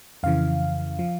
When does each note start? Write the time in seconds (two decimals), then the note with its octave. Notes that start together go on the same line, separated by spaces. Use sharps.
0.23 F2 C#3 E3 F5
0.99 F3